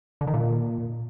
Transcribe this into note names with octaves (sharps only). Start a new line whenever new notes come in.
D3
D#3
A#2